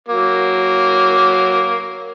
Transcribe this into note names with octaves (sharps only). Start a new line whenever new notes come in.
F#3 A#3